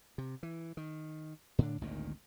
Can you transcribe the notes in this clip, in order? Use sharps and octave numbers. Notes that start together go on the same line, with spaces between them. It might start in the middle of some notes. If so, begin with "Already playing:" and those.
C3
E3
D#3
A2 D3 D4
G#1 D2 A#2 D#3